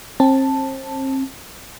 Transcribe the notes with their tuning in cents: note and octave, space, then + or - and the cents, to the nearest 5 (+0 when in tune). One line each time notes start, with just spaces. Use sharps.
C4 +35 A5 +0